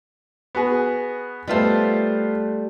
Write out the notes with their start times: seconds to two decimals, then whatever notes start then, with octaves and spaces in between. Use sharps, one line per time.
0.55 B3 F#4 G#4
1.48 G3 A3 B3 F4 C5